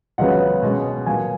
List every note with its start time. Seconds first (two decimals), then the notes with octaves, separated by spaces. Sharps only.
0.18 C#2 C#3 F#3 B3 D#5 F#5
0.62 B2 G#3 C#4
1.06 A#2 F#3 B3 F5 G#5